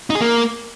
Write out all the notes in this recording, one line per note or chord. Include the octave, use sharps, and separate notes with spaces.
D#4
G#4
A#3